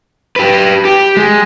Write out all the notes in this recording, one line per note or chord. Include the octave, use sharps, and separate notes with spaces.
G4 B4
G4
G#3